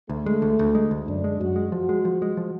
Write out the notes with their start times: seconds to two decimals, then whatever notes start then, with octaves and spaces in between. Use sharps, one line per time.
0.09 D2 A3
0.26 G#3
0.42 D2
0.59 D2
0.75 G#3
0.91 D2
1.07 F#2 D4
1.24 G#3
1.40 F#2 F#4
1.56 G#3
1.72 F3 F#4
1.89 G#3
2.05 F3
2.22 G#3
2.37 F3